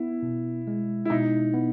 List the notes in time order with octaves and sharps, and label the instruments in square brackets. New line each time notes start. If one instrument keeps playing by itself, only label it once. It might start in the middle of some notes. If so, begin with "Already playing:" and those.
Already playing: [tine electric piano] B3 [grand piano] E4
[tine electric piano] B2
G#3
[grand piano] E4
[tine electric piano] B2 [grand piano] D#4
[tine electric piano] B3